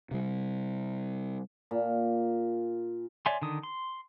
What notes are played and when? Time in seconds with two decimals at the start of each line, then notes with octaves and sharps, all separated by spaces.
0.11 C3 G3
1.71 A#2
3.26 C#5 D5 E5 G#5 C6
3.42 D3 D#3 D#6
3.63 C6